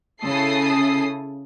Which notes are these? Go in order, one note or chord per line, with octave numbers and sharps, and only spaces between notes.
C#3 E4 A4 D#6 C7